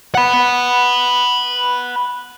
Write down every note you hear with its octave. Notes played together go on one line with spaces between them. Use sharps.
F#5 B5